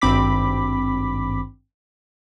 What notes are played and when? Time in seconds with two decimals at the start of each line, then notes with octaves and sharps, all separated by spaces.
0.01 G#1 G2 C4 B5 D6 B6